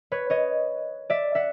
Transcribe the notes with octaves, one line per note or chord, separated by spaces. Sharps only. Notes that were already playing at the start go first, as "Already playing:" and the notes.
B4 C#5
C#5 D#5
D5 E5
E5 F#5